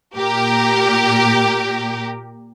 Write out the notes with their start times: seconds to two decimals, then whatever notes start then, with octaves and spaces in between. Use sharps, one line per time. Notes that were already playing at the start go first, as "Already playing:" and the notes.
0.15 A#2 G4 A#4